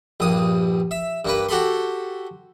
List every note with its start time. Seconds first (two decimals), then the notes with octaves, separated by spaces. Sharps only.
0.20 A#1 G2 D#6
0.91 E5
1.25 G2 A#3 B4
1.49 F#4 G4 A4 B5 C6